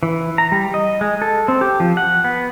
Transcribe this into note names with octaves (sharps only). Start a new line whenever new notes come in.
E3
A#5
G3
D#5
G#3
A4
C4
G4
F3
F#5
B3